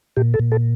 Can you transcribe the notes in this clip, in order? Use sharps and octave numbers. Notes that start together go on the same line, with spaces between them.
A#2 G4
A4
A#2
A4